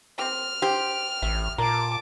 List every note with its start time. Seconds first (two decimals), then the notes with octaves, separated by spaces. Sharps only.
0.19 C4 G4 F6
0.62 G4 C5
1.22 A1 E5
1.58 A#2 A#4 A5 D6